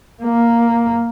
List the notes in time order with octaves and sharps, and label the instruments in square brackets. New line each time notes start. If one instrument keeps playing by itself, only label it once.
[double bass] A#3